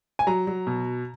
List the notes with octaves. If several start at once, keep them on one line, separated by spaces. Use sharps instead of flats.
G#5
F#3 A#5
F#3
B2